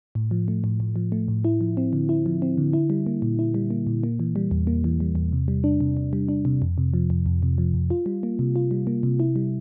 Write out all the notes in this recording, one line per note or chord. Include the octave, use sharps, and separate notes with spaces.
A2
F3
A3
A2
A2
F3
A3
A2
E4
F3
C4
D3
E4
F3
C4
D3
E4
G3
A#3
A#2
E4
G3
A#3
A#2
A#3
E3
G3
E2
A#3
E3
G3
E2
C3
G3
D4
C3
C3
G3
D4
C3
F2
C3
F3
F2
F2
C3
F3
F2
F4
G3
A#3
C3
F4
G3
A#3
C3
E4
G3